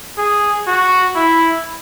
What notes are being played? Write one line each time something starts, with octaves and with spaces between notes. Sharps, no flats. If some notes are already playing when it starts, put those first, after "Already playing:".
G#4
F#4
E4